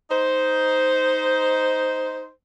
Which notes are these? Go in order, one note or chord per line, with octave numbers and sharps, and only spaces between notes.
D#4 C5